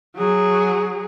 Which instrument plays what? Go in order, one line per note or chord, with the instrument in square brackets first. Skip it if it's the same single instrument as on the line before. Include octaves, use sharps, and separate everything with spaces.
[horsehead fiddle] F#3 G#4